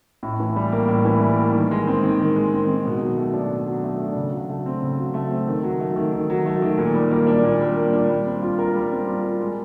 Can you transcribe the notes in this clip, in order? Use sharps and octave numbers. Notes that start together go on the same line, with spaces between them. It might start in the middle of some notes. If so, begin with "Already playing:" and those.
A2
E3
G3
A#3
A2
E3
G3
A#3
D#3
G#3
C4
D#3
D#3
G#3
C4
D#3
B2
F#3
A3
D4
B2
F#3
A3
D4
C#3
F#3
A3
C4
C#3
F#3
A3
C4
D#3
F#3
A3
D#3
D#3
F#3
A3
D#3
A#2
G3
A#3
D4
A#2
G3
A#3
D4
G3
C4
F4
A#4
G3
C4
F4
A#4
G#3